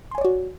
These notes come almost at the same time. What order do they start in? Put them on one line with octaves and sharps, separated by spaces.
C6 G#5 C#5 D5 F#4